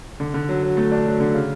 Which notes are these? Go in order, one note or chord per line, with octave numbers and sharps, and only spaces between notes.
D3
D3
F#3
F#3
A3
D4
F#3
D3
C#3